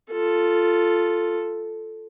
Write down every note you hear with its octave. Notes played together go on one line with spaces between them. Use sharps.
F4 A4